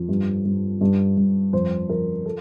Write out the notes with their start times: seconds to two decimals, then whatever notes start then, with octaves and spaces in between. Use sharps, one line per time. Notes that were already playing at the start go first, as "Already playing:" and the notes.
Already playing: F2
0.09 G2
0.45 G2
0.81 G2
1.17 G2
1.53 F2 C5
1.89 F3 A#4
2.26 A4